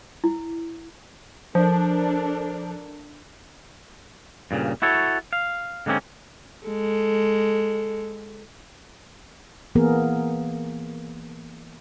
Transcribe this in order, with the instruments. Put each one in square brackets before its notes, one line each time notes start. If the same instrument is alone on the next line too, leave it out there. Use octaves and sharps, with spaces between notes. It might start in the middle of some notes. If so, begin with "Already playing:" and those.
[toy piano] E4
[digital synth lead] F3 [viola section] D4 A4 A#4
[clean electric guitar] G2 A#2 C#3
E4 F#4 A4 C#5
F5
D3 G#3 A#3 C4 C#4
[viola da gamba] G#3 A4
[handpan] E3 A#3 B3 G#4 A#4